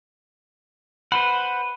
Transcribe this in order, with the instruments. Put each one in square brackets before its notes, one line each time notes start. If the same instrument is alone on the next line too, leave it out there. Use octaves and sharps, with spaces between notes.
[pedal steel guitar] B4 C5 F#5 [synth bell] B5